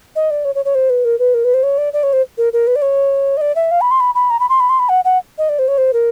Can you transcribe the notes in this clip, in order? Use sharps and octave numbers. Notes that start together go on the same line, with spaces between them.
D#5
D5
C#5
C#5
C#5
C5
B4
A#4
B4
A#4
B4
C5
C#5
D5
D5
C#5
C5
A#4
A#4
B4
D5
C#5
D#5
D5
E5
F5
B5
C6
B5
B5
A#5
B5
C6
B5
C6
B5
F#5
F#5
D#5
D5
C5
C#5
C5
A#4